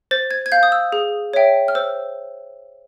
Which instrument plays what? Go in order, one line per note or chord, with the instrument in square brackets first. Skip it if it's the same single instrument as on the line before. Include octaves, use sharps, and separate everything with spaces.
[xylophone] C5 A6
G#6
G#6
F5 G6
D#6
E6
G#4
C#5 E5 G5
F6
C5 E6